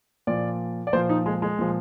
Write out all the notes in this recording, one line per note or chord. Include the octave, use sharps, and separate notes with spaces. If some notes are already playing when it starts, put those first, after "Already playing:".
A#2 F3 D5
D5
A#2 F3 C5
D#4
G#3
G#3
A#2 F3